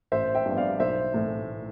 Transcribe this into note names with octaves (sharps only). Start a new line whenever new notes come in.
A1 C5 E5
E5 G5
G2 F3 B3
D5 F5
B1 C5 E5
A2 E3 A3